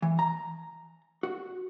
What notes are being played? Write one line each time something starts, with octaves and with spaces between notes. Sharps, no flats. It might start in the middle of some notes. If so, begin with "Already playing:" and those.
E3
A#5
F#4